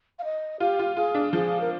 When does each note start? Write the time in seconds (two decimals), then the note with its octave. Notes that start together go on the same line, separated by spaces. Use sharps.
0.19 F5
0.24 D#5
0.60 F4 G4
0.79 F4
0.96 F4 G#4
1.15 D4
1.33 F3 G#4
1.61 A#4